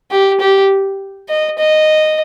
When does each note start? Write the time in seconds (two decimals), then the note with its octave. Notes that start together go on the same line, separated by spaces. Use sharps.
0.11 G4
0.40 G4
1.28 D#5
1.58 D#5